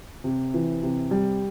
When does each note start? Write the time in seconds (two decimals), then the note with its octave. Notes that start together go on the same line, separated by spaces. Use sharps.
0.24 C3
0.54 E3
0.83 C3
1.11 G3